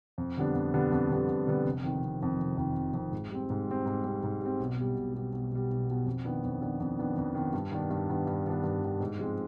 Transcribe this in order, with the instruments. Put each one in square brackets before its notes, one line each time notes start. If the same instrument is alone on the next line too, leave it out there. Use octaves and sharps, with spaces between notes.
[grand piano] F2
D3 G3 B3 D4
F2
D3 G3 B3 D4
F2
D3 G3 B3 D4
F2
D3 G3 B3 D4
F1
F2 D#3
F1
F2 D#3
F1
F2 D#3
F1
F2 D#3
G#2
G3 C4
G#2
G3 C4
G#2
G3 C4
G#2
G3 C4
B1
B2 G3
B1
B2 G3
B1
B2 G3
B1
B2 G3
F2
D#3 B3 D4
F2
D#3 B3 D4
F2
D#3 B3 D4
F2
D#3 B3 D4
G2
D#3 B3 D4
G2
D#3 B3 D4
G2
D#3 B3 D4
G2
D#3 B3 D4
G#2
F3 G#3 C4